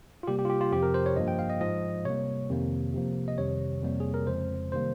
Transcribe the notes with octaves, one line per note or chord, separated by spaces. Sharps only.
F4
C3 G3 A#3 G4
G4
F4
G4
F4
F2 C3 F3 G4
A#4
C5
C#5
G2 F3 A#3 D#5
G5
F5
D#5
G#2 F3 G#3 D#5
C3 G3 A#3 C#5
F2 C3 D#3 A#3
C3 F3 A#3
D#5
F2 C3 D#3 G3 C#5
F2 C3 G3 A#3
G#4
A#4
F2 C#3 G#3 C5
C3 D#3 G3 A#3 C5